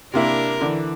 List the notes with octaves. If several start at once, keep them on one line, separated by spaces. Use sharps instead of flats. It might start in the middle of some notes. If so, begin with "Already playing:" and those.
C3 A#3 D4 E4 A#4
D3 E3